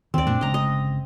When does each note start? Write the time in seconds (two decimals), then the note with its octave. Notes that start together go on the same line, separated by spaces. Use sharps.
0.14 D2 D#3 C4 D5
0.27 F#2 A#2 A3 D4
0.41 G1 C#3 G#3 D#5 A#5
0.54 D#5